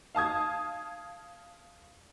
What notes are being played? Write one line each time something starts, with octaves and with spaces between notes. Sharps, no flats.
F5 A5 D#6 G#6